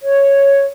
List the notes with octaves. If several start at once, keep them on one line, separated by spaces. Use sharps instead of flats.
C#5